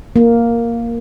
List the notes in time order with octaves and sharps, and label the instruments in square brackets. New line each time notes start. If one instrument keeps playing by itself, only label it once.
[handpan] A#3